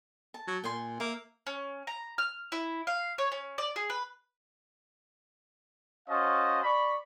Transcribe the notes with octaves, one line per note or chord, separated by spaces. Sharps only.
A5
F#3
A#2 G5 G#5 C6
A#3 E5
C#4
A#5
F6
E4
F5
C#5
C#4
D5
G#4
B4
C#4 F#4 C5 D#5 F5 A5
D5 B5 C#6